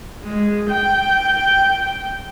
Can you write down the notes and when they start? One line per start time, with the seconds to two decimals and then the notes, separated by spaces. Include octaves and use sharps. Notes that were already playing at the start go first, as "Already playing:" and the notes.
0.25 G#3
0.70 G5